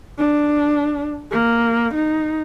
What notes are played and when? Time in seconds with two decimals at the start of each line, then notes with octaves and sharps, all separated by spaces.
0.18 D4
1.32 A#3
1.94 D#4